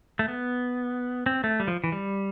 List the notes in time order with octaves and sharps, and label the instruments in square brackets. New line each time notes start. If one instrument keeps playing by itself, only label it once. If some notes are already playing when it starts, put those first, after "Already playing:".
[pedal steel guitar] A3
B3
C4
A3
G3
F3
E3
G3